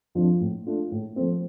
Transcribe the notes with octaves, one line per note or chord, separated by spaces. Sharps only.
F2 F3 D4 F4
A2
A3 D4 F4
A2
F3 A3 C4